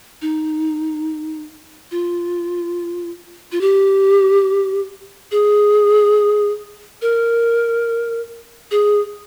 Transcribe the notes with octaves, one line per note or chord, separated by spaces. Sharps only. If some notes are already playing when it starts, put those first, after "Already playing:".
D#4
F4
F4
G4
G#4
A#4
G#4